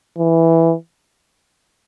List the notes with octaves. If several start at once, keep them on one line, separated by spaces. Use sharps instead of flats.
E3